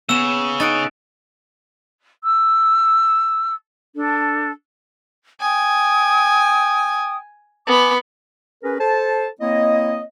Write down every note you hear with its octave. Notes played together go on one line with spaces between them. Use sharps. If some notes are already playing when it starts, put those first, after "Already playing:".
C#3 B3 E6 E7
D#4 F#5 A6 D7
E6
D4 A4
G5 G#5 D#6
B3 G#5 B5 D6
C#4 G#4 A#4 B4
A4 C5 A5
A#3 C4 E4 C#5 D#5